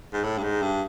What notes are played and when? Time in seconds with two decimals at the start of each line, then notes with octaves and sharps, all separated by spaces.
0.13 G#2
0.24 A2
0.38 G2
0.44 G#2
0.62 G2